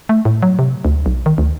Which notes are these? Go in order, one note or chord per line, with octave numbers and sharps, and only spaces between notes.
A3
A2
F#3
C3
D2
B1
D#3
D2